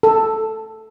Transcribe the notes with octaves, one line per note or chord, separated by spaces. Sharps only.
A4